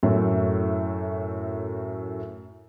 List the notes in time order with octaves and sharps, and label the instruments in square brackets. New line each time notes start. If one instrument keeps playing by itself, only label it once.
[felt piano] F#2 A2